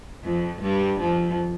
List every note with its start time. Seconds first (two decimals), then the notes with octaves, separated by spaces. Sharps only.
0.24 F2 F3
0.62 G2 G3
1.00 F2 F3